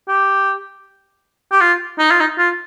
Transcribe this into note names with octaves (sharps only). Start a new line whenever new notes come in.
G4
G4
F4
D#4
F4
D#4
F4